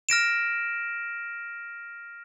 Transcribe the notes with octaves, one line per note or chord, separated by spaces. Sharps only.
F6 A#6 D7 E7